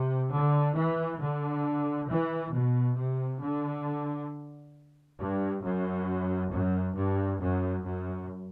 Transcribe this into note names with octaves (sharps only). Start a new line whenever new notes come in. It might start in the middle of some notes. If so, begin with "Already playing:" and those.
Already playing: C3
D3
E3
D3
E3
B2
C3
D3
G2
F#2
F#2
G2
F#2
F#2